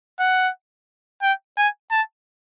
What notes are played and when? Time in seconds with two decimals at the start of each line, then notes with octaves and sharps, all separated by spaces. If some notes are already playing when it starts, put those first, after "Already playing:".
0.19 F#5
1.22 G5
1.58 G#5
1.91 A5